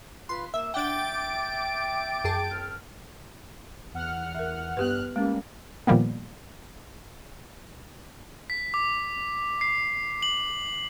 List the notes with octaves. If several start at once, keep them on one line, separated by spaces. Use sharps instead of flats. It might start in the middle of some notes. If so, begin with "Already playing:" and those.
F4 B4 C6
A#3 E5 E6
D4 E5 F#5 G5 D6 A6 D7
F#2 G#4 A5
C2 C4 F6
E2 F#5 F6
A#4 E5
G2 B3 G4 B4 F6 F#6
G3 G#3 A#3 C#4
A#2 D#3 F3 G3 A#3 B3
B6
D6
C7
F#7